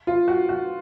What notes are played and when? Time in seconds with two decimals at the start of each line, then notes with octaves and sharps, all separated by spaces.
0.07 F4
0.28 F#4
0.49 F#4